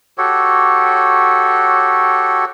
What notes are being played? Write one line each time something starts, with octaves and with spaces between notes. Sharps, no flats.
F#4 G4 A4 C#5